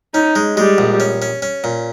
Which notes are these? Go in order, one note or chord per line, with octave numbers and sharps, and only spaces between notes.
C#4 D#4
G#3
G3 G#3
A#1
C#4
C#4
C#4
A#2